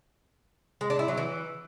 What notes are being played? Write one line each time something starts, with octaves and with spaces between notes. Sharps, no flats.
G#3
D4
E4
F#3
E3